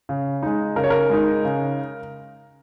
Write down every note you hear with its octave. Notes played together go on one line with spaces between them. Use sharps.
C#3
G#3 D#4
C#3 A#4
C#5
A#4
G#3 D#4
C#3